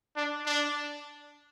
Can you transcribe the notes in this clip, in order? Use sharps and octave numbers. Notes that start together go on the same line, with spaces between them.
D4
D4